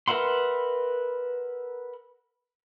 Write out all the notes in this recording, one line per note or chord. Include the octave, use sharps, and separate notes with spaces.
A#4 B4 E5 F#5 C6